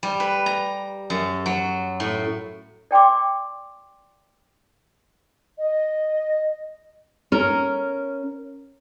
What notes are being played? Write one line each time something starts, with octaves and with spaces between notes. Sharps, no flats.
G3
B4
A#5
F#2
F#3
A2
D5 G5 C6 D6
D#5
C#4 A#4